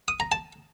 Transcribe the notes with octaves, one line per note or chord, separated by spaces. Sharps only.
D#6
A#5
A5